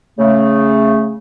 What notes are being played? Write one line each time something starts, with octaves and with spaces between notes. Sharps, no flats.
C#3 A3